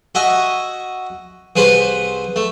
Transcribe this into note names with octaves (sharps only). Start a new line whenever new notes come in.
F#4 D#5 E5 G#5
C2 G#4 B4 C5 B5
A3